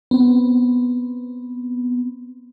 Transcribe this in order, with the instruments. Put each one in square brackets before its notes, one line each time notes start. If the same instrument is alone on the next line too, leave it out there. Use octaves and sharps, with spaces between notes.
[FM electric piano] B3 C4